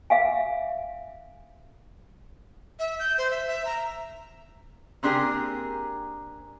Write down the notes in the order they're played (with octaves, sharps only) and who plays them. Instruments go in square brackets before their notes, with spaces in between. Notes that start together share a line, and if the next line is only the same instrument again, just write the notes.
[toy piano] E5 F5 G#5
[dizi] E5
G6
C5
E5
E5
A#5
[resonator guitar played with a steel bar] A#3 C4 D4 G4 G#4 A#4